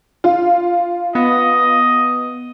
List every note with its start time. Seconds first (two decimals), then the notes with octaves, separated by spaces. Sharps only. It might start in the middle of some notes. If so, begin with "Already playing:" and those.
0.24 F4
1.15 B3 D#5